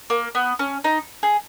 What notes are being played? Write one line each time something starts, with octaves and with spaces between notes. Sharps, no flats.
A#3
B3
C#4
D#4
G#4